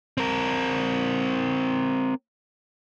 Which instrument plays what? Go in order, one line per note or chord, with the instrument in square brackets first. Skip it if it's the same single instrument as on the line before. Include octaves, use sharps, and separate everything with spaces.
[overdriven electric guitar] C4 A#4